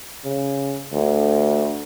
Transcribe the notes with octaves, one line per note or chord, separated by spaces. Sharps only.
C#3
D2